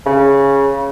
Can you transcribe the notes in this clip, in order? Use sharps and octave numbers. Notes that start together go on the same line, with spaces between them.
C#3